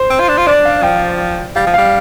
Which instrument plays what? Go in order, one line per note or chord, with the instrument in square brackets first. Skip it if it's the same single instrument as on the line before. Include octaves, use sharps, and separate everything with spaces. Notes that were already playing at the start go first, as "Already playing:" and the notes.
Already playing: [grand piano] C5
[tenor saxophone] C4
F4
D4
F4
[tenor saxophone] D4 [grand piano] D5
[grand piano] F5
[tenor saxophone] F3 [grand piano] G5
[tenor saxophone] G3 [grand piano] F5
[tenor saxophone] F3
[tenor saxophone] G3 [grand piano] F5